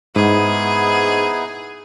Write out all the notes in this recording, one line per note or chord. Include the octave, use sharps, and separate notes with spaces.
G#2 B3 D#4 E4 G#4